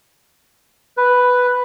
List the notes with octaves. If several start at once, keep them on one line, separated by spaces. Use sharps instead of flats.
B4